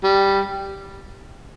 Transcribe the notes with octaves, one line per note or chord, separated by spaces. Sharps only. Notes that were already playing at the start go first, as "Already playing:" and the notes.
G3